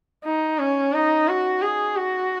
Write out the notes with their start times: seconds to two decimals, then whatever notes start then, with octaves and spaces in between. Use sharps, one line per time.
0.25 D#4
0.59 C#4
0.94 D#4
1.28 F#4
1.62 G#4
1.96 F#4